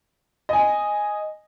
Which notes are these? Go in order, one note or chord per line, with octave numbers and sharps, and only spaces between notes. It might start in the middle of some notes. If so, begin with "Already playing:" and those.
D#5 G#5